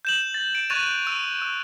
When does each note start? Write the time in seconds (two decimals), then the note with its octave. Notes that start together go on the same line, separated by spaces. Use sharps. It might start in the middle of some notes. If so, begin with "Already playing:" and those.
0.05 G6 E7 F#7
0.34 A6
0.55 D7
0.70 C#6 F#6 G#6 A6 D#7 F7
1.07 E6
1.42 E6